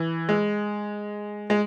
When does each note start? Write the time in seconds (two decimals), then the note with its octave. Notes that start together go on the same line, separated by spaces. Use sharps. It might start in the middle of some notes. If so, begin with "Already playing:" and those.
Already playing: E3
0.29 G#3
1.50 G#3